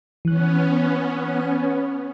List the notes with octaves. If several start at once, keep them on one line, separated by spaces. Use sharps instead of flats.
E3 B3 C#4 F#6